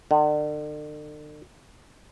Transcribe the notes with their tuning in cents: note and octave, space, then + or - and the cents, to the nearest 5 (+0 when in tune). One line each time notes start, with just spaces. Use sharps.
D3 +40